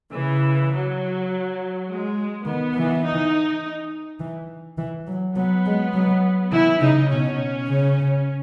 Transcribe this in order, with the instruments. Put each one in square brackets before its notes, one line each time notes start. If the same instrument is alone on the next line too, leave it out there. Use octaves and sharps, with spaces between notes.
[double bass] C#3 [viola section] E3
[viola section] F#3
G#3
[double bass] D#3 [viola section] B3
[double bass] E3
[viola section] D#4
[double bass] E3
E3
F#3
[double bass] F#3 [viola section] B3
[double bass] G#3
F#3
[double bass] E3 [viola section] E4
[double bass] C#3 [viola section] D#4
[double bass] B2 [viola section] C#4
[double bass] C#3